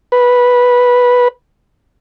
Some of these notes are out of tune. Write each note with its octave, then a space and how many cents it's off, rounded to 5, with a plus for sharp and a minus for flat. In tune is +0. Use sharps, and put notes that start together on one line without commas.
B4 -10